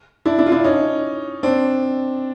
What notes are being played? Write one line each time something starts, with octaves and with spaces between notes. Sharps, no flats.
D4 E4
D4 E4
F4
D4 E4
C#4 D#4
C4 D4